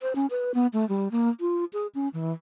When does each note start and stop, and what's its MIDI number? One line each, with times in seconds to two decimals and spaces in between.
0.01 0.13 72
0.15 0.26 61
0.30 0.52 71
0.54 0.67 59
0.73 0.87 57
0.89 1.11 55
1.11 1.29 58
1.40 1.65 65
1.73 1.87 68
1.95 2.08 61
2.13 2.32 52